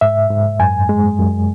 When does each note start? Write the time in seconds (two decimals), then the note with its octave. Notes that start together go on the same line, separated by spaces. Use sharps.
0.01 G#2 E5
0.30 G#2
0.60 F#2 G#5
0.89 G#3
1.19 F#2